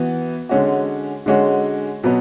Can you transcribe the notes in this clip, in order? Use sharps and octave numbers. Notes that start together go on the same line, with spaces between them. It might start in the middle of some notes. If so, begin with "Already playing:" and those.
Already playing: E3 B3 F#4
D3 G#3 C#4 F#4
D3 G#3 C#4 F#4
B2 F#3 B3